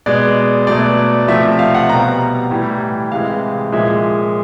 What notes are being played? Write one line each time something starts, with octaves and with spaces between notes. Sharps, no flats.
B2 G#3 D5
B2 F#3 A3 D5
C3 F3 A3 E5
F5
F#5
B2 G3 A#5
A2 E3 G3
C3 E3 G#3 F5
A#2 F3 G#3 E5